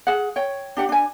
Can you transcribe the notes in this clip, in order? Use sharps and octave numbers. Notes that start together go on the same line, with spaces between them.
G#4 F#5
C#5 G5
D4 G4 F#5
D4 G#5